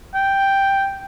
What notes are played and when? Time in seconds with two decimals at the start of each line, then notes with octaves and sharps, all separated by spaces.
0.15 G5